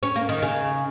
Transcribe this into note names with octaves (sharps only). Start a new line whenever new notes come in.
C#4
A#3
D#3
C#3